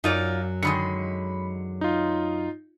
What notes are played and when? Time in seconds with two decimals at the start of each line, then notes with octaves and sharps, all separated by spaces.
0.04 F#2 F#3 D#4 F4 D5
0.63 D3 D#3 G#3 B5 C#7
1.81 D#4 F4